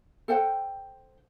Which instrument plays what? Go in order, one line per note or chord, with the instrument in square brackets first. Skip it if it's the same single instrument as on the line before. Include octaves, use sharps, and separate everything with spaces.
[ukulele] A4 C5 F#5 G5